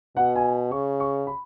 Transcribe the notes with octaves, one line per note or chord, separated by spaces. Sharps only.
B2 F#5
G#5
C#3 C#6
C#6
B5